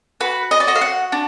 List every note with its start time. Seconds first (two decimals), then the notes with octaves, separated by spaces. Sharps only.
0.20 F#4 B4
0.51 D#5
0.60 D5
0.67 F#4 D#5
0.76 F5
0.81 F#5
1.12 D4